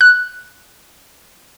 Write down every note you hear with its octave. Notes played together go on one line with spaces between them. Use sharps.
F#6